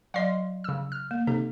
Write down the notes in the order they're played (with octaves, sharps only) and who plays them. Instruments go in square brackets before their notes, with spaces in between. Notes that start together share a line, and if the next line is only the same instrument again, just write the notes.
[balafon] F#3 D5 D#5 [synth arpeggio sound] F5 C6
[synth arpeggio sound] C#3 E6
F6
[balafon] A#3
[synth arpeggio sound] C3 [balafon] D#4 A4